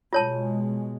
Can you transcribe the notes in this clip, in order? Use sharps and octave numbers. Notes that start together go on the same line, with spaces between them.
B2 G#3 F4 C#5 A5